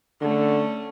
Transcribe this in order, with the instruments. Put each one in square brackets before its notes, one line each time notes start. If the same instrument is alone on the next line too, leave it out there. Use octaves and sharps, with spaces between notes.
[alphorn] D3 [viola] A3 C#4